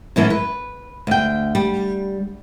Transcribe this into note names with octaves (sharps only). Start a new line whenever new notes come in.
F#2 A2 E3 C#4
B4
D2 G5
G3